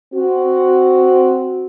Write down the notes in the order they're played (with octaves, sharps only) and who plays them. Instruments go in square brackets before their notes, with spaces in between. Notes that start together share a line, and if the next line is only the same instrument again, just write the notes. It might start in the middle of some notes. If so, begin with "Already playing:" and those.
[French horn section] C4 F#4